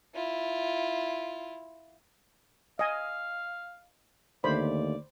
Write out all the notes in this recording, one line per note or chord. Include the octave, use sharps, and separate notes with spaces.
E4 F4
D#5 F5 G#5
D#2 D3 A3 C5 D5 B5